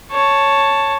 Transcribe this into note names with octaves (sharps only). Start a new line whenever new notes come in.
C#5 A5